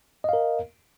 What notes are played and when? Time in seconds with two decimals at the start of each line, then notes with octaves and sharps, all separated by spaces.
0.24 D#5
0.29 F5
0.33 A#4